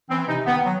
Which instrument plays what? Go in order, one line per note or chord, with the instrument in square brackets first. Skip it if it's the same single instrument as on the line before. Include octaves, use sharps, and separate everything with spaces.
[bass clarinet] E3 [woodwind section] C4
[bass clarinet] C3 [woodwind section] D#4
[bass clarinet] D#3 [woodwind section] B3
[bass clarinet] F#3